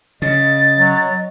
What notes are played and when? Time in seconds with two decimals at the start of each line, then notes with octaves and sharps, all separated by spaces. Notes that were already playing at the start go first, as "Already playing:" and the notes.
0.22 C#3 D#5 A6
0.77 F#3